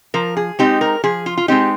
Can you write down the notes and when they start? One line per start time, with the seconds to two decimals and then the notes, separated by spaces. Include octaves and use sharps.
0.14 F3 A#4
0.37 G#4
0.59 G#3 C4 D#4 G4
0.81 A#4
1.04 F3 G#4
1.26 F4
1.37 F4
1.48 G#3 C4 D#4 G4